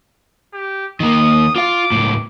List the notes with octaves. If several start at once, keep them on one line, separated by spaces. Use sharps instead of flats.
G4
D#3 A#3 D#6
F4 F5 D6
C#2 A2